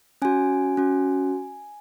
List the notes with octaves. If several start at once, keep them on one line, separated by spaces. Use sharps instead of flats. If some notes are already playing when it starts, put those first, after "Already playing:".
C#4 F#4 G#5
C#4 F#4